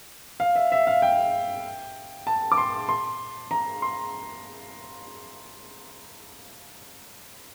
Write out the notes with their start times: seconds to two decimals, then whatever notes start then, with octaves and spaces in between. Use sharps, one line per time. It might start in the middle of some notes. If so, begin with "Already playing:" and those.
0.40 F5
0.56 E5
0.72 E5
0.87 F5
1.02 G5
2.27 A5
2.52 D6
2.58 C6
2.89 C6
3.51 A#5
3.82 C6